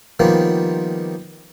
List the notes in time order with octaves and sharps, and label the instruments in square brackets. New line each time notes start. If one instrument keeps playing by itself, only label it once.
[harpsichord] D#3 F3 G3 A#3 B3